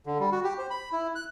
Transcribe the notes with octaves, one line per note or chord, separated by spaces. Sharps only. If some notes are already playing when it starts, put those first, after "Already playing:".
D3
G3
F#4
G4
C5
B5
E4
F#6